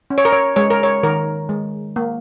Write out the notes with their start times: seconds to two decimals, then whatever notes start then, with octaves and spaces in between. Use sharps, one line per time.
0.10 C#4
0.18 C#5
0.25 A#4
0.32 C#5
0.56 G#3 C#5
0.70 A#4
0.83 C#5
1.03 D#3 A#4
1.49 G#3
1.96 A#3